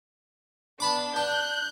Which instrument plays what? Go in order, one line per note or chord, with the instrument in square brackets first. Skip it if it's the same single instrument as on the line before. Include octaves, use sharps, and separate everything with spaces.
[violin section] B3 D4 [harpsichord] A5 B5 D6
[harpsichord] D4 [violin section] F#6 G6